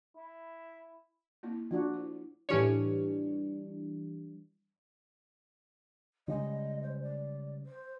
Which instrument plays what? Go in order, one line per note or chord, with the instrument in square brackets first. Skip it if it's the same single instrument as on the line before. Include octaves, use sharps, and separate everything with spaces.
[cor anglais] E4
[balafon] A#3 C4 E4
[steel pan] F3 D4 F#4 [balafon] A3
[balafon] E4 C5
[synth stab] A2 C#4 C#5 [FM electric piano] E3 G3 D4
[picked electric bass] C#3 G3 G#3 [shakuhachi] D#5
[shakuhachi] C5
D5
C5